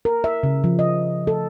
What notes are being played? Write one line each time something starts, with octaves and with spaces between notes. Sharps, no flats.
A#4
E5
C#3
F3
D#5
A4